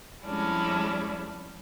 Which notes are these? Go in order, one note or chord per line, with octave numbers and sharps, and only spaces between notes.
F2 G3 G#3 C#4 D4 E4